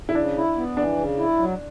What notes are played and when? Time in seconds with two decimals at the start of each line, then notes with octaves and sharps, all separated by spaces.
0.09 E4
0.15 C#3 D4
0.37 E4
0.57 B3
0.77 E3 D4
0.98 C#3
1.18 E4
1.39 F#3